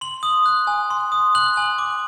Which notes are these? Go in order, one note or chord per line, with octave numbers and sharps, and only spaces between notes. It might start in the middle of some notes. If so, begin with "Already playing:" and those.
C6 F#7
D#6
F#6
G#5
C6
D#6
F#6 F#7
G#5
D6